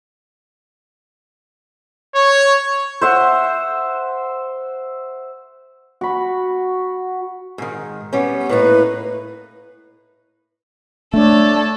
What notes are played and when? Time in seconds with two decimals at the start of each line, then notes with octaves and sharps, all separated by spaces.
2.15 C#5
3.01 C5 E5 F#5
6.01 F#4 B5
7.58 G#2 D#3
8.13 G3 B3 C#4
8.49 A2 A#3 D#4 B4
11.14 A3 D4 A4 C#5